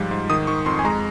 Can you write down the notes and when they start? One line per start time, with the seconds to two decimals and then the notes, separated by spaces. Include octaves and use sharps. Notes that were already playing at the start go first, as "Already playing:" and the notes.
Already playing: G#2 F3 G3
0.11 G#2
0.30 D#3 D#6
0.47 D#3 C#6
0.66 F2 C6
0.79 G#5
0.85 G#3 A#5